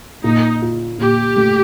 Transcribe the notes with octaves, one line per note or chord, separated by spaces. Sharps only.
A#2 D#4
F4
A#2 G4
A3